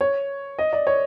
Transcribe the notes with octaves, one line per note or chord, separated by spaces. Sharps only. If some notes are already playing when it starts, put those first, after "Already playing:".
C#5
D#5
D5
C#5